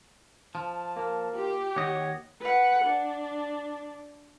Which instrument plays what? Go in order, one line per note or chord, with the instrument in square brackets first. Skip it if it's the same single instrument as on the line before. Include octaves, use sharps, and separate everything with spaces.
[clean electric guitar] F3 [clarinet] A5
[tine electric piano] A#3 A#4
[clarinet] F4 [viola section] G4
[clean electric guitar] D#2 D#5 [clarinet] C#5 [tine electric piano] F#5
[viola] B4 F#5
D4